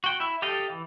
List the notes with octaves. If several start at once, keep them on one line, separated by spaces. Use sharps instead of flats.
F#4 G5
E4 E5
G4 A4 D#5 F5 G5
E3